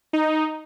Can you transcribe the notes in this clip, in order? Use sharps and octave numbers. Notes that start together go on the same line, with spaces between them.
D#4